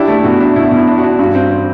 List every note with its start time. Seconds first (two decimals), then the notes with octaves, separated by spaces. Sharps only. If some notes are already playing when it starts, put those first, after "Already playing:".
Already playing: D4 E4 G4
0.08 A3
0.24 B2 F#4
0.40 D4
0.56 B2 E4
0.71 B2
0.77 E4
0.87 D4
0.98 F#4
1.03 D4
1.18 G2 F#4
1.35 C4
1.51 C4